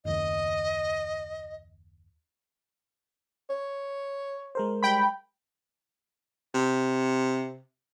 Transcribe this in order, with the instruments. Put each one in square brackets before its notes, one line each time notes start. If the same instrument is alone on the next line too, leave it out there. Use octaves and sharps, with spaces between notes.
[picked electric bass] F#1 D#2 [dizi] D#5
[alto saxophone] C#5
[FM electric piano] G#3 A#4 C5
[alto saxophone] G3 [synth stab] G5 B5
[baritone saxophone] C3